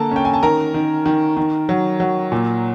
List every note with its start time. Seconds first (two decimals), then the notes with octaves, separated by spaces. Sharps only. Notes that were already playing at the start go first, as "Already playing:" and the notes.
Already playing: D3 A#3 A4 A5 A#5
0.11 C#4 G5
0.25 G#5
0.33 A5
0.43 D#3 A#4 A#5
0.74 D#3
1.06 D#3
1.37 D#3
1.69 F#3
2.00 F#3
2.32 A#2